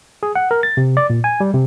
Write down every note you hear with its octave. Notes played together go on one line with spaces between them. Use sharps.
G#4
F#5
A#4
A6
C3
D5
A#2
G#5
G3
C3